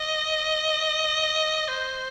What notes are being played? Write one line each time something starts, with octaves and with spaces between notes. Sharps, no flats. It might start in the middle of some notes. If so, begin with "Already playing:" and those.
Already playing: D#5
C5